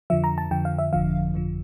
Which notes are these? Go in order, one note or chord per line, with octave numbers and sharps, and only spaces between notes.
F2 D3 F3 E5
A#5
A5
F2 D3 F3 G5
F5
E5
G1 F2 D3 F3 F5
G1 F2 D3 F3